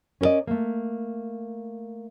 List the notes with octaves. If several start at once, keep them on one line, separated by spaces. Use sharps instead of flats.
C#4 A#4 B4 D5 D#5
A3 A#3